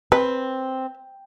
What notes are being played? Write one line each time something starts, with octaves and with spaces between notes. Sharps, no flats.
C4 B4